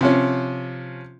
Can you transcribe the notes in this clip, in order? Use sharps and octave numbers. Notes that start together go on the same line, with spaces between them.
C3 F3 C#4